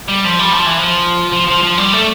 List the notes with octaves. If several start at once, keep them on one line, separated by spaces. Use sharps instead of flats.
G3
F3
G3
F3
E3
F3
F3
F3
F3
G3
A3